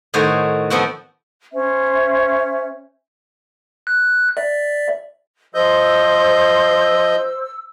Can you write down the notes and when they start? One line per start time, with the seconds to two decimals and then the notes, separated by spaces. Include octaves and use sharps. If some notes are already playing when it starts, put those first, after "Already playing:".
0.14 A2 D#3 F#4 C5 G#5
0.70 F3 B3 C4 F#4
1.52 C#4 C5 E5
3.87 F#6
4.37 D5 E5
5.54 F3 C5 D#5 E6 G6